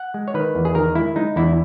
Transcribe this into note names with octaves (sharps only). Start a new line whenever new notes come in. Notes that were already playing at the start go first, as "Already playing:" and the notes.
Already playing: F#5
G#3
C#5
D#3 B4
E2
G#4
D#3 A#4
G#3 E4
G#3 D#4
E2 E4